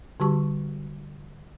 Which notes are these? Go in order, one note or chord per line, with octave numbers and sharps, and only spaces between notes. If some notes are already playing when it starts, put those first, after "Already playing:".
D3 G3 F#4 G4 A5 C#6